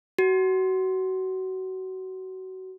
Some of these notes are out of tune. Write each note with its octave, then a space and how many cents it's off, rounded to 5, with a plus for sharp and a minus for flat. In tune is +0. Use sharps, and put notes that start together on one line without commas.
F#4 +25